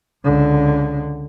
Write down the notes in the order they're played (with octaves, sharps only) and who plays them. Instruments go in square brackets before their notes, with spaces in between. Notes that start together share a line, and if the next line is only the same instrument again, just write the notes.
[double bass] C#2 D3